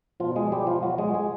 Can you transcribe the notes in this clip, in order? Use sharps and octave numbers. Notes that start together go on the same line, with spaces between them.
B2 F3 F4
G#3 G#4
G3 G4
F3 F4
F#3 F#4
G#3 G#4
G#3 G#4